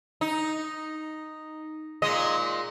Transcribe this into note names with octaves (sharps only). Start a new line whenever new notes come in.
D#4
A#2 G#3 D#5